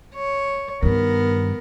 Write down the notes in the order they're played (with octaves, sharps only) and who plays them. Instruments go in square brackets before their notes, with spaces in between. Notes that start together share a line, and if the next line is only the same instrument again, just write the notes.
[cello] C#5
[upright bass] G2 D#3 [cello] B3 A#4